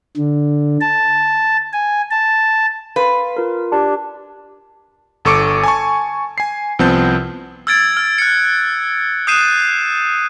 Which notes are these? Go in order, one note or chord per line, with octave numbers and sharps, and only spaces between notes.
D3
A5
G#5
A5
B4 F5 C6
F4 A#4
D4 G4
G1 A4 C#6 D6 C#7 D7
G#5 A5 C#6
G#5 C7
C2 F3 B3 C4 A5 G6
E6 F6 G#6 A6 D7
F6
F#6 C#7
D#6 F#6 G6 C7 D#7 E7